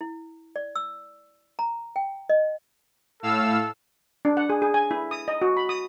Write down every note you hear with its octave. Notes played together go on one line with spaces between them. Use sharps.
E4
D5
E6
A#5
G5
D#5
A2 A4 F5 E6
D4
F#5
G#4
G#4
G#5
E4
D#6
D#5
F#4
B5
D#6